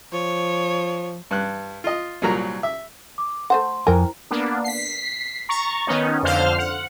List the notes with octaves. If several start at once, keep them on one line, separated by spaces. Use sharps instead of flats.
F3 C#5
G2 F#6
F4 D#5
C2 A#2 F#3 A#4 A#5
E5
D6
A3 C5 F#5 C6
F2 E4 A#4 C5 G5 G#5 A#5
A#3 B3 D4
B6 C7
A#5 C#6 A6
D#3 B3 C#4 D#4
F2 D3 C5 F5 F6
F#5